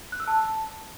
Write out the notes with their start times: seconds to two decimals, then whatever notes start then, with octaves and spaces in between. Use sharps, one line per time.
0.12 F#6
0.20 E6
0.27 A5